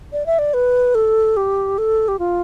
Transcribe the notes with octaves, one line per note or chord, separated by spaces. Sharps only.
D5
E5
D5
B4
A4
G4
A4
G4
F4